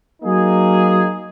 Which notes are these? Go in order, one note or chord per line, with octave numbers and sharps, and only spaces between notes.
F#3 A#3 D#4 G#4